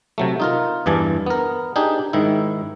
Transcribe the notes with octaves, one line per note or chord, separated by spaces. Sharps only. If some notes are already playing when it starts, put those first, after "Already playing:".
C3 F#3 A3
D#4 F4 A#4
E2 G2 E3 G#5 A5
B3 A#4
D4 D#4 G4 G#4
G#2 D#3 E4